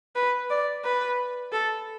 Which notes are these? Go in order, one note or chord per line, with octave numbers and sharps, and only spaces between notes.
B4
D5
B4
A4